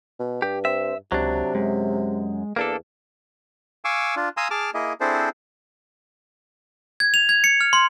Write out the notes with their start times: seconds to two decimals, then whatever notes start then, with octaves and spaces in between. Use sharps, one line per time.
0.19 B2
0.42 G2 G4
0.65 C4 E5
1.12 C#2 C3 F#3 D4
1.55 F#2 G#3
2.56 E2 A#3 D4 A4
3.85 F5 G#5 C#6 D6 E6
4.16 D4 F4
4.37 F5 G#5 A#5 C6 D#6 E6
4.51 G#4 A5 D6 F6
4.74 A#3 E4 G#4 D#5
5.01 C4 D4 E4 G#4 A4 C5
7.00 G#6
7.14 F7
7.29 G#6
7.44 C#7
7.61 F6
7.73 C6